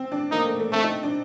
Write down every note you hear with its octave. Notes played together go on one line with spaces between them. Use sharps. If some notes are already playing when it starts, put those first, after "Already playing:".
Already playing: C4
D4
A#3 D#4
A3
A3
A3 C4
D#4
D4